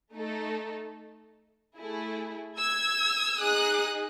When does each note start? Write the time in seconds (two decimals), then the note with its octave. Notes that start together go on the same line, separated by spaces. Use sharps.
0.12 A3 D#4 A4
1.77 A3 E4 G#4
2.58 E6 G#6
3.40 D#4 G#4 D#6 F#6